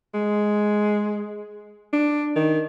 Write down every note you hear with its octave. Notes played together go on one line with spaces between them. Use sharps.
G#3
D4
D#3